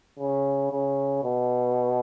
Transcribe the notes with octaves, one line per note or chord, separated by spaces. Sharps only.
C#3
C#3
B2